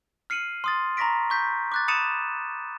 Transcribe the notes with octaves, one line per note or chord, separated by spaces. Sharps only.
F6 C7 C#7 D#7 F#7
C6 D#6 A6
A#5 B5 C#6 A#6 B6 D7
C#6 G6 B6
D6 F#6 A6
B5 D#6 A6 C#7 D#7 E7